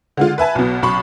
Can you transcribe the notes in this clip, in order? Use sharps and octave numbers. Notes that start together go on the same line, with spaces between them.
D3 G#3 F4
B4 E5 G#5 A5
B1 B2
B1 B5 C#6